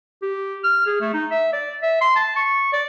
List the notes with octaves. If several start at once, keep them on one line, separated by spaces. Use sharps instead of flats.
G4
F6
G#4
A3
D#4
E5
D5
E5
C6
A5
C#6
D5